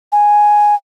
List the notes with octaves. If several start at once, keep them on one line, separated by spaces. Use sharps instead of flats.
G#5